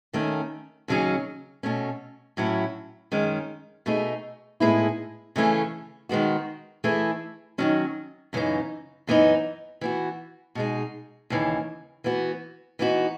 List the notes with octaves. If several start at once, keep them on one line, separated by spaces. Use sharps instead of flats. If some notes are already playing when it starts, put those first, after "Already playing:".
D#2 D#3 A3 C#4
D#2 C#3 F#3 C#4 G#4
B2 A3 C#4
A2 F#3 C#4 E4
F#2 D#3 G#3 C#4
B2 A3 D#4 G#4
A2 G#3 B3 E4 G#4
C#3 E3 A3 C#4 G#4
D#3 G#3 B3 F#4
E3 A3 E4 G#4
D#2 D#3 F#3 C#4
F#2 C#3 E3 B3 D#4
F#2 E3 B3 D#4
E3 B3 F#4
B2 G#3 D#4 G#4
D#2 C#3 E3
E3 B3 F#4
E3 B3 D#4 F#4